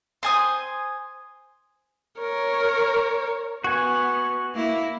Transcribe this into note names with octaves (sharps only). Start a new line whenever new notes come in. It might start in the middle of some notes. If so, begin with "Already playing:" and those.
C5 G#5 D#6
A#4 C#5
B3 F#4 G#5
A#3 E4